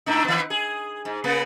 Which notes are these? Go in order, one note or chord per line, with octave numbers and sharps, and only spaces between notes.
G#2 D4 D#4
D#3 B3
G#4
G#2
C#3 A#3 B3